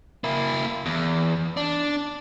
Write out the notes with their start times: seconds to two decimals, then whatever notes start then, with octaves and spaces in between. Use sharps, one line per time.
0.24 A#3 E4
0.86 E2
1.57 D4